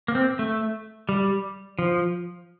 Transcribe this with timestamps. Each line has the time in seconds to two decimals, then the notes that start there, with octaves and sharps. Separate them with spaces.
0.08 A#3
0.15 C4
0.39 A3
1.09 G3
1.79 F3